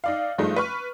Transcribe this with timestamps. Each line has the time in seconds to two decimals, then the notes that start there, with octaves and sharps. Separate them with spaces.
0.04 D#4 D5 F5
0.38 G2 F3 G#3 A3 D#4
0.56 B4 C#6 F6